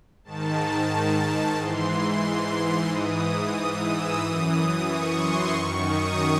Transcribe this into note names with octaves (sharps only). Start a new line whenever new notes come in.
G#2 D#3 A5
A5
G#2 E3 C6
G#2 E3 D#6
D#6
E6
F#2 E3 D#6
D#6
C#6
C6
F#2 D#3 C#6
D#6